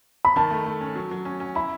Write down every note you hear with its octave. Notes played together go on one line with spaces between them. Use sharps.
B5
D#3 A5
A3
A3
C#4
F#3
F#3
C#4
C#4
E4 B5